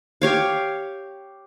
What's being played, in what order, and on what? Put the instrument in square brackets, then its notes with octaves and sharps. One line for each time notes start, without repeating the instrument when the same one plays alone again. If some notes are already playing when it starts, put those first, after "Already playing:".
[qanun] G4 C#5 F5